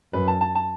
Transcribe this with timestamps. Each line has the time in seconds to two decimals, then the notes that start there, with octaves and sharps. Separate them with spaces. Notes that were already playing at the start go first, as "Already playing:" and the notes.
0.13 F#2 B4
0.28 A5
0.41 A5
0.55 A5